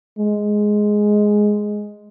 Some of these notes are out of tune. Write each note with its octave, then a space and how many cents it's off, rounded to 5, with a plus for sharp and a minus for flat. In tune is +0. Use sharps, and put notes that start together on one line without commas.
G#3 +5